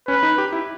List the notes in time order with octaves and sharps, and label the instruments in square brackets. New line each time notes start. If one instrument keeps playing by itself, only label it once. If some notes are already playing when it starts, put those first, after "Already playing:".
[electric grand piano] C#4 [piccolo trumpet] B4
[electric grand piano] D#4
G4
E4